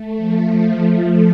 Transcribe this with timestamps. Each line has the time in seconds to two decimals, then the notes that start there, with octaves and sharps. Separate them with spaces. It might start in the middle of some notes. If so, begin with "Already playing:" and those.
Already playing: A3
0.17 F3